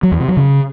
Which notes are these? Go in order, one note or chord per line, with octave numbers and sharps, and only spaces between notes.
F#3
E2
C3
F#3
C#3